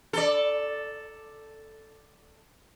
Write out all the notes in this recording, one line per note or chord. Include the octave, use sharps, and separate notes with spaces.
A4 D5